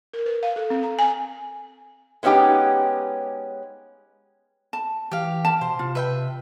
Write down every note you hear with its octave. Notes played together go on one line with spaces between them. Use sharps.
A#4
B4
F5
A4
C4
A#5
G#5
G#3 B3 C#4 D#4 G4
A5
E3 G4 F5
A5
B2 C5
C3 F4
B4 E5 G5